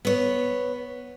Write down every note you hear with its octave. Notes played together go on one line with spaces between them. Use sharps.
B3 C#5